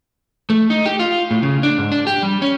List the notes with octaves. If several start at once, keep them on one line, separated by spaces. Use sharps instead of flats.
A3
D#4
G4
F4
A2
C#3
D4
G#2
D4
G4
G3
C#4